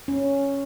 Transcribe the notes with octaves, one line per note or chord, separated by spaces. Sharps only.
C#4